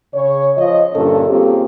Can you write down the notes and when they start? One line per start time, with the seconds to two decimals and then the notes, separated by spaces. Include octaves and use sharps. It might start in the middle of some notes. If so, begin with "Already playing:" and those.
0.14 C#3 C#5
0.58 F3 D#5
0.95 G2 A#2 D3 C#4 A4 C#5
1.30 A#3 C4 F4 G4 G#4